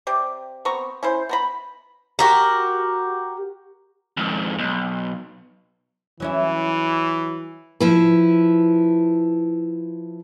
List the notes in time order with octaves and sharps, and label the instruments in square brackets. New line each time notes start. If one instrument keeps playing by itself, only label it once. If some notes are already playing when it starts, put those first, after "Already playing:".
[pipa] C3 G4 D5
B3 C4 A#5 C#6
C#4 E4 C5
B3 A#5 B5
[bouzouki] F#4 G4 A#4
[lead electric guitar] F2 G#2
B1
[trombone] E3 [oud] F#3 C#4 E4
[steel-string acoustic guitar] F3 E4 B4